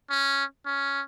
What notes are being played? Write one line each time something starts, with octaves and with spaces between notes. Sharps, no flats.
C#4
C#4